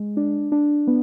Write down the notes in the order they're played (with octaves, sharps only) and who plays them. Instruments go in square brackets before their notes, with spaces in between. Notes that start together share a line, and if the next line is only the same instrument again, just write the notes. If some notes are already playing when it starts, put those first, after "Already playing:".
Already playing: [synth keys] G#3
D4
D4
B3